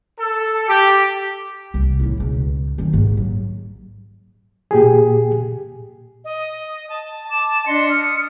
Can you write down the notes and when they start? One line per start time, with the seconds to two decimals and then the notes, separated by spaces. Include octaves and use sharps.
0.18 A4
0.68 G4
1.74 C2
1.99 A2 E4
2.20 C#2 B2
2.78 D#3 F#3
2.93 A#1 G#2
3.17 F#3
4.71 A#2 G4 G#4
6.25 D#5
6.90 A5
7.31 A5 D6 E7
7.66 D4 D#5 C6 C#7
7.89 D#6 F6